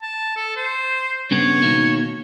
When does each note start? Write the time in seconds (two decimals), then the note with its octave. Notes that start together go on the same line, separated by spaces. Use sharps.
0.02 A5
0.36 A4
0.56 C5
1.31 G2 C#3 B3 C#5
1.62 B2 D#3 A#3